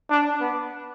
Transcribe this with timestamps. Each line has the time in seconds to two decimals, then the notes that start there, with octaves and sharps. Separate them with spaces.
0.10 D4
0.41 B3